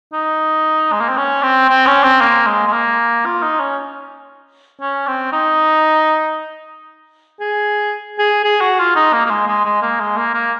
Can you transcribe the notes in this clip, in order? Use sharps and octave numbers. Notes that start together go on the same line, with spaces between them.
D#4
G#3
A#3
C4
C#4
C4
C4
C#4
C4
A#3
G#3
G#3
A#3
F4
D#4
C#4
C#4
C4
D#4
G#4
G#4
G#4
F#4
F4
D#4
A#3
A#3
G#3
G#3
G#3
A#3
G#3
A#3
A#3